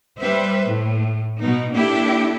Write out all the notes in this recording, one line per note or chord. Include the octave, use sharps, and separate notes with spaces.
G3 B4 C5 E5
A2
B2 D#4
A#3 D4 E4 G4 A4